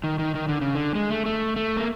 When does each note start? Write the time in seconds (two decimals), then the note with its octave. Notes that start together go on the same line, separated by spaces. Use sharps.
0.04 D#3
0.19 D#3
0.35 D#3
0.48 D3
0.61 C#3
0.75 D3
0.95 G#3
1.10 A3
1.26 A3
1.56 A3
1.77 A#3